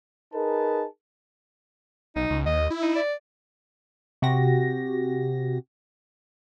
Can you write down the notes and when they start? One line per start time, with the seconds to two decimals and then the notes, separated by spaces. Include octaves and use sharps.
0.34 D#4 G#4 A#4 B4 A5
2.16 B1 D#4
2.30 C#2
2.46 D#2 D#5
2.70 E4
2.82 D#4
2.95 D5
4.22 C3 F#4 G4 A#6